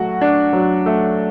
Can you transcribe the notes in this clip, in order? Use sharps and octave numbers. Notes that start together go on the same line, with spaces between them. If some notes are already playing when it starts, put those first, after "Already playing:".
Already playing: F#3 A3 F#4
D4
F#3
A3